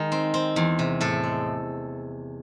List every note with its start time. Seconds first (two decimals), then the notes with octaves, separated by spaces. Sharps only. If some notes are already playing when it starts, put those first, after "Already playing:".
Already playing: D#3 G#3
0.12 C4
0.34 C4
0.56 E2
0.79 C3
1.01 A2 A4
1.24 G#3